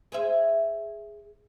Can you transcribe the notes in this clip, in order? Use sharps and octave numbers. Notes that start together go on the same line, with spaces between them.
G#4 C5 E5